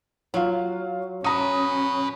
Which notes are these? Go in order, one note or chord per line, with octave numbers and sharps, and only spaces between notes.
F#3 F4 F5
C#4 F#4 B4 A#5 D#6